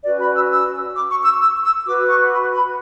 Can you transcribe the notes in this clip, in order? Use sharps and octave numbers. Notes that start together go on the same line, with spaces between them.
C#4 F#4 B4 D5
B5
E6
E6
D6
C#6
E6
E6
E6
F#4 B4 D6
C#6
B5
B5